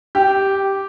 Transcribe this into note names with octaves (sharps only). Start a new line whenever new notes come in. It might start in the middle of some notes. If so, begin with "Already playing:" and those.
G4